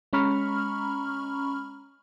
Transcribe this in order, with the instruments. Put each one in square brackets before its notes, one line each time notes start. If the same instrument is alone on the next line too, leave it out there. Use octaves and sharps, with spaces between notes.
[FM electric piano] G#3 C#4 A#5 B5 C#6 F6